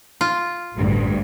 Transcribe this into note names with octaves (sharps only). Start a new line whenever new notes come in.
F4
A1 D2 G2